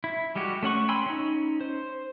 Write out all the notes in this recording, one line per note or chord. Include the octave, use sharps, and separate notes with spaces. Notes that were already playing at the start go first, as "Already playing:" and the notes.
E4
G3 G#3 F#4 G4
A3 C#4 F#5 C#6
G5 G#5 B5 C6 E6
C#4 D#4
C5